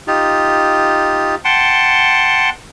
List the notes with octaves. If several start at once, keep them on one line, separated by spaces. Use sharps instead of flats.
D#4 F4 G4
F#5 G5 A5 C6